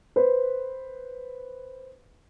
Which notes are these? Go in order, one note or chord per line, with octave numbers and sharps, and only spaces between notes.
B4 C5